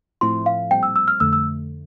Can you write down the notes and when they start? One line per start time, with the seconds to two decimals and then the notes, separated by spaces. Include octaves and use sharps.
0.21 A2 F3 A3 C4 E4 C6
0.46 F5
0.71 A#2 G3 C4 G5
0.83 E6
0.96 E6
1.08 F6
1.20 F2 D3 A3 E6
1.33 E6